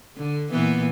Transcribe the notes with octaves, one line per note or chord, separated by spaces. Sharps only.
D3
A#2 E3 B3